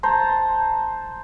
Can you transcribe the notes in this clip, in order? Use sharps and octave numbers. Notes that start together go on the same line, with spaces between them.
C5 A5 A#5